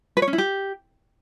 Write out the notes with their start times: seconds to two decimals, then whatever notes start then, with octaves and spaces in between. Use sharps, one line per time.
0.17 B4
0.22 C#5
0.28 C#4
0.33 E4
0.38 G4